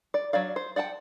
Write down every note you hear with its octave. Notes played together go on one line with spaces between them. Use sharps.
D5
F#3 D4 D5 F5
C5
D5 F#5 G5 A5